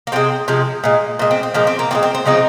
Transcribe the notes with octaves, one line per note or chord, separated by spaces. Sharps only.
A#3
C3 F3 G#3 C4
C3 F3 G#3
A#2 G#3
A#2 G#3
C4
C4
A#2 F3 G#3 A#3
C4
A#3
A#2 F3 G#3 C4
C4
C4
C#3 F3 G#3 C4 D#4